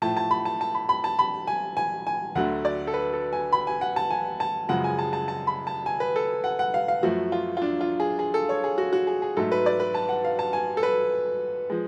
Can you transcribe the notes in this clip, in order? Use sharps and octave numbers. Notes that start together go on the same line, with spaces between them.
A2 F3 A3 A5
A5
B5
A5
A5
B5
B5
A5
B5
G#5
G#5
G#5
D2 D3 F#3 A3 F#5
D5
A4
B4
A4
G#5
B5
G#5
F#5
A5
G#5
A5
F#2 C#3 F3 G#3 F#5
G#5
A5
A5
A5
B5
A5
G#5
B4
A4
F#5
F#5
F5
F5
F#2 F3 A3 F#4
F4
F4
D4
F4
G#4
G#4
A4
C#5
G#4
F#4
F#4
G#4
G#4
G#2 F#3 A3 A4
B4
D5
B4
A5
F#5
F5
A5
G#5
A4
B4
F3 G#3